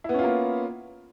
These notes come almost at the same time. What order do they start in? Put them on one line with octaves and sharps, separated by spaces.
E4 B3 C#4 F4 A#3